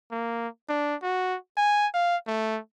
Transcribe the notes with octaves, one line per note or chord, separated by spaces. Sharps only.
A#3
D4
F#4
G#5
F5
A3